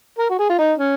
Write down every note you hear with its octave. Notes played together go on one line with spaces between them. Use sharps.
A#4
F#4
G#4
F4
D#4
C#4